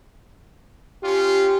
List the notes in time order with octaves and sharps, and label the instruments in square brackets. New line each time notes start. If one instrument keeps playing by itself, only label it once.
[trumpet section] C#4 F4 [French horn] G4